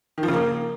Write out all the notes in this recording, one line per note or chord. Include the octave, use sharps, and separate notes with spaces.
D#3
F3
C#3
A#3